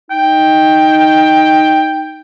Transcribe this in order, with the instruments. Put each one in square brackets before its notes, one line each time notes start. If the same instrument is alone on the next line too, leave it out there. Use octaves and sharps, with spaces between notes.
[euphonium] D#4 [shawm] G5